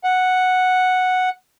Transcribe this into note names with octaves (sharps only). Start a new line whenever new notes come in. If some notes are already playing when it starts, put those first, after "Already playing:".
F#5